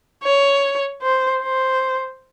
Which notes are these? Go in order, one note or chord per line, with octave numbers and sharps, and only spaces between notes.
C#5
C5
C5